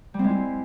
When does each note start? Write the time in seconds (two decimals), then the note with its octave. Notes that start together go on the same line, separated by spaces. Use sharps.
0.14 G3
0.19 C4
0.24 G#3
0.29 E4